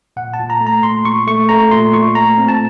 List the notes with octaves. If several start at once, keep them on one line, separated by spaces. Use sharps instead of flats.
A#2 F#5
A5
A#2
A#5
A3
A#5
A#2 C6
A#2 C#6
A3 C#6
A3 A#5
A#2 C6
A#2 C#6
A3 A#5
C4
A5